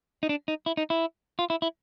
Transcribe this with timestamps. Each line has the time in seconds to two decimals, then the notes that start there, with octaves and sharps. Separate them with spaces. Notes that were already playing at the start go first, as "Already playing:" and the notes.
0.23 D#4
0.29 D4
0.48 D#4
0.66 E4
0.77 D#4
0.90 E4
1.39 F4
1.50 E4
1.62 E4